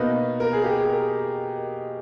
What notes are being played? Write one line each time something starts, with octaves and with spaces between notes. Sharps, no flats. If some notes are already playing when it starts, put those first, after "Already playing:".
Already playing: B2 A#3 D#4 B4
A#4
G#4
G4
G#4
A#4